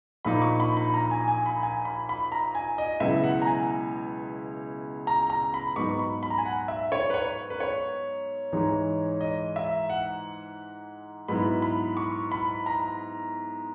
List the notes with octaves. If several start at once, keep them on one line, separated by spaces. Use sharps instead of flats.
A#1 A#2 A#3 D#4 B5
C#6
B5
B5
A#5
G#5
G#5
B5
G#5
B5
B5
A#5
G#5
D#5
C#2 B2 F#3 B3 E4 E5
F#5
A#5
G#5
A#5
A#5
B5
G#2 F#3 B3 D#4 C#6
B5
B5
A#5
G#5
F#5
E5
C#5
B4
C#5
B4
C#5
G#2 E3 G#3 D#4
D#5
E5
F#5
G#2 F#3 B3 E4 B5
B5
C#6
B5
A#5